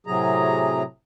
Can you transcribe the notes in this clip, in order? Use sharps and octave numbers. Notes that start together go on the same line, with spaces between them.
A2 C3 F#3 G#4 A#5